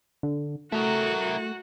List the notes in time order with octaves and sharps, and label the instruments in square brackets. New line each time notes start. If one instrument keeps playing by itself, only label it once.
[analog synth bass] D3
[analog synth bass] A3 [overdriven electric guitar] E4 A#4 [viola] F#4